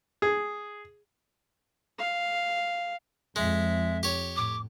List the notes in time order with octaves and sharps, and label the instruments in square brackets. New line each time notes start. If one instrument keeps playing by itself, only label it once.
[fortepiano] G#4
[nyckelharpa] F5
[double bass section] F2 [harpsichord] G#3 [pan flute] E5
[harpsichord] G4 C#5
[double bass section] A2 [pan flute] D6